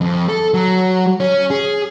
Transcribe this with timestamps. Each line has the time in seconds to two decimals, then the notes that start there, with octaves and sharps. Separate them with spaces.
0.01 F2
0.29 A4
0.54 F#3
1.20 C#4
1.51 G#4